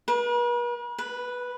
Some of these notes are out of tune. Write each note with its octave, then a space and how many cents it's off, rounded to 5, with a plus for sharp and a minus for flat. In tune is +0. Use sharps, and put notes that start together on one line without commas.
B4 -45
B4 -5